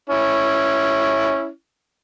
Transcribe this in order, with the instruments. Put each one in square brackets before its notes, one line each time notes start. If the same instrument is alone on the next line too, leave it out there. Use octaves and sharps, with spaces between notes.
[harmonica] C#4 E4